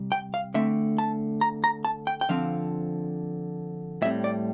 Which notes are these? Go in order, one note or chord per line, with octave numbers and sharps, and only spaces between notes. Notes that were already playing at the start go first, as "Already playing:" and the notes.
Already playing: C3 G3
G5
F5
D3 A3 C4 E5
A5
A#5
A#5
A5
G5
G5
D3 F3 C4 F5
A2 G3 C4 E5
D5